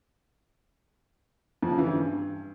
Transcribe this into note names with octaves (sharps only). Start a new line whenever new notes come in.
F2
C#3
E3
G2